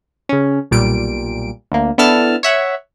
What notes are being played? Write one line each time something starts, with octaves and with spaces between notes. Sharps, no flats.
C#3 C#4
B1 A#2 G3 D7
D2 A#3
B3 D4 E4 A4 A5 F6
C#5 E5 F#5